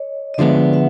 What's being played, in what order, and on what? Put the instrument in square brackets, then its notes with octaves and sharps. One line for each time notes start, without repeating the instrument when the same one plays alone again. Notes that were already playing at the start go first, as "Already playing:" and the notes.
Already playing: [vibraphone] C#5 D#5
D#5
[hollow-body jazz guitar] D3 F3 G#3 B3 [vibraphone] D5 E5
[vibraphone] E5 F#5